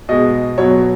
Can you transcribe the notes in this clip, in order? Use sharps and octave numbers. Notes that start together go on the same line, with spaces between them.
B2 G#3 D#5
B2 F#3 C#5